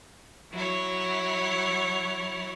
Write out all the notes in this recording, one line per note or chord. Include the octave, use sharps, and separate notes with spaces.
F#3 E4 C#5